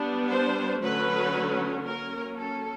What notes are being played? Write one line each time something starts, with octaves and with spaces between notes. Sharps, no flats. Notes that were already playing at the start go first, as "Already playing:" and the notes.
Already playing: G3 B3 D4
C5
D3 F#3 A3 C#4 B4
F#3 A#3 C#4 A#4
A4